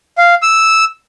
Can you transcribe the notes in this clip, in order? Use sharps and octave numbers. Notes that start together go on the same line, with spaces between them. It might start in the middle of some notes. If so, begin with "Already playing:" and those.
F5
E6